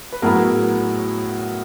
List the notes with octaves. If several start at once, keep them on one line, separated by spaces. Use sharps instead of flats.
B4
A2 F#3 B3 E4 G#4 A#4